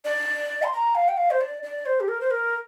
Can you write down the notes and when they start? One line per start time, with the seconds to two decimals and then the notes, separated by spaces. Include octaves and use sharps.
0.05 D5
0.63 C6
0.73 A#5
0.95 F5
1.08 G5
1.17 F5
1.31 C5
1.41 D5
1.63 D5
1.86 C5
2.00 G4
2.08 A#4
2.21 C5
2.31 A#4